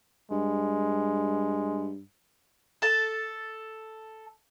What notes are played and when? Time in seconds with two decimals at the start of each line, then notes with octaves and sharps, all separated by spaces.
0.31 G2 G#3
2.82 A4 A5